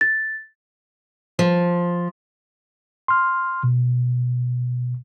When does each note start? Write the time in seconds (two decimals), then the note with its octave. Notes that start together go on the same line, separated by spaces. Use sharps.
0.01 A6
1.39 F3
3.08 C6 F6
3.64 B2